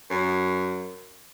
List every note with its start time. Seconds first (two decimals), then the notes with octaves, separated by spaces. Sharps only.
0.11 F#2